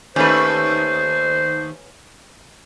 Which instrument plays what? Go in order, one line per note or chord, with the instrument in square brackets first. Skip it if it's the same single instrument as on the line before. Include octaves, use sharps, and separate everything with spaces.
[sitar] D#2 A3 [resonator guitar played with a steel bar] C#4 B4 [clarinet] C5